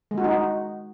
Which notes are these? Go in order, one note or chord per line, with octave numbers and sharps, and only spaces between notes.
G#3
F#4
D#4